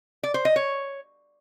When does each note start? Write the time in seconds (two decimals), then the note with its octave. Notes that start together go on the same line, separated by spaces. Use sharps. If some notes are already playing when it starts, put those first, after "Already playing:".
0.23 D5
0.34 C5
0.45 D#5
0.56 C#5